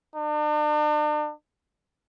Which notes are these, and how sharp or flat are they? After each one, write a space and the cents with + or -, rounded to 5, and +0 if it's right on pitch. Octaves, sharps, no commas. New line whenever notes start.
D4 +40